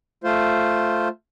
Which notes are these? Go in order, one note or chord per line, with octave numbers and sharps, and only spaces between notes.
A3 F4 C5